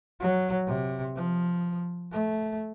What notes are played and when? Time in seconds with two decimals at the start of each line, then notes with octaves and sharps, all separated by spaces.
0.20 F#3
0.67 C3
1.16 F3
2.12 A3